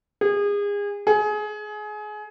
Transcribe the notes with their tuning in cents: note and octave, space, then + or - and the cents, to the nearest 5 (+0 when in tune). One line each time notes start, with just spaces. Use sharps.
G#4 -30
G#4 +25